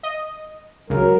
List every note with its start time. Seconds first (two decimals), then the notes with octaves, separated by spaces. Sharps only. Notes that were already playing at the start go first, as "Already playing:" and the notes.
0.03 D#5
0.90 C#2 F#3 A#4